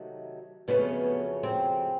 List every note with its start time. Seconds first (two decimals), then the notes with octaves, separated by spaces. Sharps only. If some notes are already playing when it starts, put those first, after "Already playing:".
Already playing: C3 D#3 F#3 A3
0.68 F2 C#3 F#3 A3 B3 C#4
1.43 C4